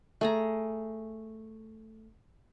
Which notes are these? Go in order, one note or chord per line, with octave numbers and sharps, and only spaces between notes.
A3 G#4 A#5